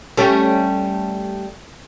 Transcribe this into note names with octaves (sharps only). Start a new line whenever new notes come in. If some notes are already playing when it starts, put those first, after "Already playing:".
G3 A3 C#4